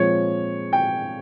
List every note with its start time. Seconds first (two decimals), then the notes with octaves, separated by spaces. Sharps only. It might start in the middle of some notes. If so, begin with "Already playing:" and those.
Already playing: A#2 F3 G#3 C4 C#5
0.73 G5